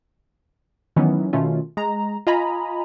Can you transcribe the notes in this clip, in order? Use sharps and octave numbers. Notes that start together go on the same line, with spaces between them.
D#3 E3 F#3 B3 C#4
B2 D#3 A3 C#4 F4
G#3 A#5
F4 D#5 G#5 A#5 B5